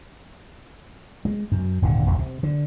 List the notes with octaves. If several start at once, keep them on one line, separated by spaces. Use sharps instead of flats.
G#3
F#2
D#1 G#2 D3
D#1 C2 F2
C3
D3